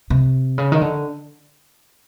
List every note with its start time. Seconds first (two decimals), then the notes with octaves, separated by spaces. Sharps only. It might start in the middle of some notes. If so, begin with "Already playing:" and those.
0.10 C3
0.58 C#3
0.72 D#3
0.81 D3